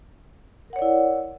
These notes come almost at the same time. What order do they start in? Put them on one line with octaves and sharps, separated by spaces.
A#4 F#5 C#5 D5 E4